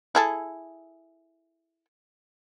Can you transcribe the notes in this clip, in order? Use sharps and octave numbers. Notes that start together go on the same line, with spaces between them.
E4 G#4 A4